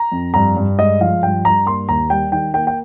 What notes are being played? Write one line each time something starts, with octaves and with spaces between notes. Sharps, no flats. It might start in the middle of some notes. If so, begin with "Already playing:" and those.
Already playing: A#5
F2
G2 A#5
G2
G#3 D#5
F3 F5
G2 G5
G2 A#5
A#3 C6
D#2 A#5
G3 G5
D#3 G5
A#3 G5
G5